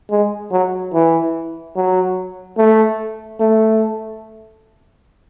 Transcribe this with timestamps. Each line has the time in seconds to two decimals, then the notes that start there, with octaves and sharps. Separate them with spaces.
0.11 G#3
0.51 F#3
0.94 E3
1.76 F#3
2.57 A3
3.40 A3